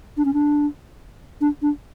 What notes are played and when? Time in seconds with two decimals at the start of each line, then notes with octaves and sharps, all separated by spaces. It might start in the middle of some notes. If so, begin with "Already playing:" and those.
0.17 D4
0.25 C#4
0.34 D4
1.41 D4
1.62 D4